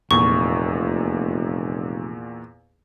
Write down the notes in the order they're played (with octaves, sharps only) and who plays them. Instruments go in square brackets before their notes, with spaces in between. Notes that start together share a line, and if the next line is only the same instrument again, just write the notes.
[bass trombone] F1 [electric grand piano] E2 A#2 [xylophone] C#6